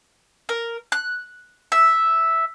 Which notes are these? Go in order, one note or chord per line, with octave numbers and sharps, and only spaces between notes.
A#4
F#6
E5